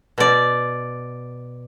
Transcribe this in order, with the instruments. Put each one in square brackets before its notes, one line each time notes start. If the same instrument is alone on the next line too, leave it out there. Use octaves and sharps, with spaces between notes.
[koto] B2 D5